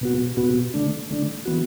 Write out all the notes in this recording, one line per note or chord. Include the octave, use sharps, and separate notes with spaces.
B2 B3 F#4
B2 B3 F#4
D3 A3 D4
D3 A3 D4
E3 B3 F#4